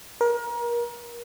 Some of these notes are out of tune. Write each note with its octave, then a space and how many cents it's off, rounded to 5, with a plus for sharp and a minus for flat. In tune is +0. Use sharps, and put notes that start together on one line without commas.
A#4 +30